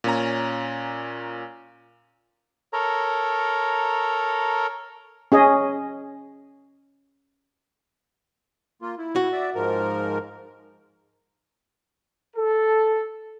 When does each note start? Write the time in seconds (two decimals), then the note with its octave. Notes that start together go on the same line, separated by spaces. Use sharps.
0.04 A#2 C#4 A#5
2.73 A4 A#4 C#5 A#5
5.32 C#4 G#4 D#5
8.82 A#3 F4
8.98 E4
9.16 F#4
9.32 D5 E5
9.55 G#2 F3 A#4
12.36 A4